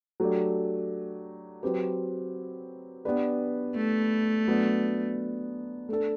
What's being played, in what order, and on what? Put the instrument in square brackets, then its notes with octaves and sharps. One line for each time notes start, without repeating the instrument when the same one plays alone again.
[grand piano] F#3 A3 D4 G4
F#3 C4 G4 B4
B3 D4 G4 B4 D5
[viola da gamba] A3
[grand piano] F#3 B3 D4
A3 D4 A4